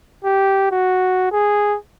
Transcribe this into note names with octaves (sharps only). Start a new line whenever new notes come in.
G4
F#4
G#4